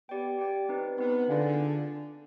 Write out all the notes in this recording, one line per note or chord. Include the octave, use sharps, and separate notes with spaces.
B3 G4 D5 G5
G4 D5 G5
C4 D#4 B4
B3 C4 D#4 B4
D3 F4 G#4 D5 F5 G#5